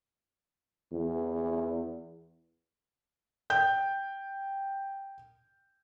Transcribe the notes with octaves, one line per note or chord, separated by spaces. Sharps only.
E2
G5 G6